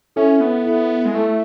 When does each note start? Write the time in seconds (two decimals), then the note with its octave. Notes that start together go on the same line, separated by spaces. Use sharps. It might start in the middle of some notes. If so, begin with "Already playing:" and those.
0.16 C#4 E4 A4 E5
0.40 B3
0.66 E4 A4 E5
1.05 G#3
1.15 A3 E4 A4 E5